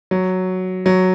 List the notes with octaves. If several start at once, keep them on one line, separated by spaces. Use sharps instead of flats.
F#3
F#3